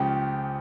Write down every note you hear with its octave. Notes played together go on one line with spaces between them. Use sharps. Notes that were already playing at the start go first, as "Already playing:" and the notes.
Already playing: C#2 C#3 F3 G4